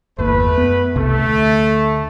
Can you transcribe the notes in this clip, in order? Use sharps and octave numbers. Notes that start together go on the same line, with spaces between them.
G1 E2 A3 A#3 B4
F#2 B3
C2 C3 A3
D2